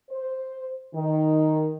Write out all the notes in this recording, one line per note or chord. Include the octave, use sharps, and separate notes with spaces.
C5
D#3